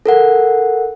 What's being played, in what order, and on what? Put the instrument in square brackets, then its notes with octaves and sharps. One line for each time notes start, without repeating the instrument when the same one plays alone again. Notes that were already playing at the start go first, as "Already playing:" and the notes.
[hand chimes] A4 A#4 F#5